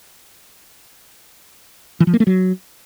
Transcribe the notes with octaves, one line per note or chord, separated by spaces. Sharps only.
E3
F3
A#3
A3
F#3